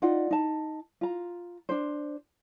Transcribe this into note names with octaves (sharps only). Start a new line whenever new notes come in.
D#4 F4 D5 F#5
D#4 A5
F4 A#5
D4 C5